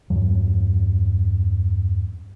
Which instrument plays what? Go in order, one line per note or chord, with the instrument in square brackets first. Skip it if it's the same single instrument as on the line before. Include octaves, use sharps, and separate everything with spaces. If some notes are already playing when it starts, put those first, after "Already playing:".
[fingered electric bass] E2 G2 F#3